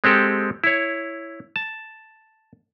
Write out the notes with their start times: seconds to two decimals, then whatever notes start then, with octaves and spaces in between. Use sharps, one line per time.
0.04 G#3 C4 G4 A4
0.64 E4 C#5
1.56 A5